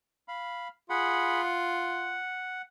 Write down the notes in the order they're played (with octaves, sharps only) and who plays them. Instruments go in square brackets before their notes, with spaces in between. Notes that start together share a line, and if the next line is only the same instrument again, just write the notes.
[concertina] F5 B5
[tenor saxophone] F4 [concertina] G#4 F#5 B5
[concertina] F#5